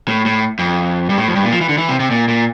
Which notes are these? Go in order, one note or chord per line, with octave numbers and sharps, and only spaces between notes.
A2
A2
F2
G2
A2
F2
G2
A#2
F3
E3
D3
E3
C3
C3
A#2
A#2